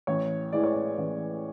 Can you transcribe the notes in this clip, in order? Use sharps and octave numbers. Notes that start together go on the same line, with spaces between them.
A1 C#5
A2 E3 G#3 D5
C#5
D5
A1